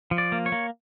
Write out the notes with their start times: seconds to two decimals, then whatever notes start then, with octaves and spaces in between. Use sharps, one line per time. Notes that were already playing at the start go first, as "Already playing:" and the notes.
0.11 F3
0.18 D5
0.32 A#3
0.46 C#5
0.52 A#3